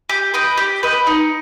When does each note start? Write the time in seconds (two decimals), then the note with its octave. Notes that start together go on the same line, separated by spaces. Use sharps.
0.09 G4
0.34 B4 D#5 G5
0.58 G4
0.83 B4 D#5 G5
1.07 D#4